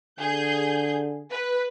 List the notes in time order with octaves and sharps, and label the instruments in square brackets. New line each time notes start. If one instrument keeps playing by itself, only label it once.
[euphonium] D3 [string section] G#4 G6
[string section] B4